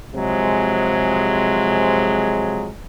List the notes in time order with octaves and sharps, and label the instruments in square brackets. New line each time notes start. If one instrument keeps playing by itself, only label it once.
[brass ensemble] C3 F3 F#3 G#3